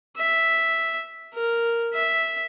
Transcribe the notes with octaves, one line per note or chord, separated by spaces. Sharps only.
E5
A#4
E5